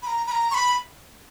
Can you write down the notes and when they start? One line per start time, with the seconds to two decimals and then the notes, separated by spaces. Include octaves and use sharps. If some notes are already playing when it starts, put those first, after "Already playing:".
0.03 B5
0.07 A#5
0.27 B5
0.31 A#5
0.51 C#6
0.54 B5